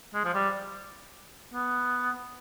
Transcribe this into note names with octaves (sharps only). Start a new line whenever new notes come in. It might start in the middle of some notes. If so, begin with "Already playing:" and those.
G#3
F3
G3
B3